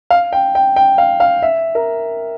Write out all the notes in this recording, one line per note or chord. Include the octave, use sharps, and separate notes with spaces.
F5
G5
G5
G5
F5
F5
E5
A#4